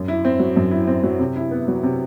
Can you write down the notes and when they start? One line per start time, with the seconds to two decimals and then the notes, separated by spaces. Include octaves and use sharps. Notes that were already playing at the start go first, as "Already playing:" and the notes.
Already playing: F#2
0.08 E4
0.25 C4
0.39 F#3
0.56 F#2
0.71 E4
0.87 C4
1.03 F#3
1.19 C3
1.36 E4
1.51 B3
1.68 F#3
1.83 C3